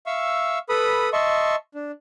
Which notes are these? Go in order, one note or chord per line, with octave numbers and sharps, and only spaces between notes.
E5 F5 C#6 E6
A4 B4 B5 D#6
D#5 E5 A5 C6 C#6
D4